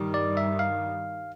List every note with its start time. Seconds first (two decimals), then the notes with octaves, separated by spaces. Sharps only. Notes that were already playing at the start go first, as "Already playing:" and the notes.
Already playing: G2 D#3 G3
0.14 D5
0.37 E5
0.59 F5